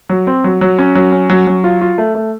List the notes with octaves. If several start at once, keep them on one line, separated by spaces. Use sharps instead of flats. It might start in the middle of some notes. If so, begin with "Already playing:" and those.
F#3
C4
F#3
F#3
C#4
F#3
C#4
F#3
F#3
F4
F4
A3
A3